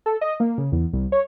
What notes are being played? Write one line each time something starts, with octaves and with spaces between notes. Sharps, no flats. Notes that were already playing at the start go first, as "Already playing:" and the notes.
A4
D#5
A#3
C#3
E2
C2
C#5